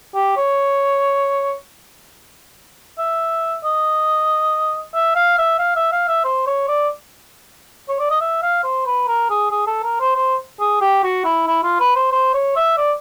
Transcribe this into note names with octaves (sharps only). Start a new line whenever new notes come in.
G4
C#5
E5
D#5
E5
F5
E5
F5
E5
F5
E5
C5
C#5
D5
C#5
D5
D#5
E5
F5
C5
B4
A#4
G#4
G#4
A4
A#4
C5
C5
G#4
G4
F#4
E4
E4
F4
B4
C5
C5
C#5
E5
D5